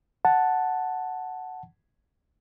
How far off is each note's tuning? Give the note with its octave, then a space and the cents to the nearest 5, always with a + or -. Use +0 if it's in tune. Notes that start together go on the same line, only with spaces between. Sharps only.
F#5 +0 A5 +0